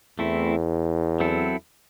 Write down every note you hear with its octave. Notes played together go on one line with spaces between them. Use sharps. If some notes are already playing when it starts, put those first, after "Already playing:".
E2 A3 C4 E4
F#3 C4 E4 A4